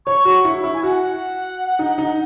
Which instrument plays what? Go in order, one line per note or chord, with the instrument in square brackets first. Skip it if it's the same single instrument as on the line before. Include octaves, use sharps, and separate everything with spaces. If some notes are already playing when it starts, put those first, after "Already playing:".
[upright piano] C#5 [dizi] C#6
[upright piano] F#4
E4
E4
[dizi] G#5
[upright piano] F#4 [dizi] F#5
[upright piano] D#4
D#4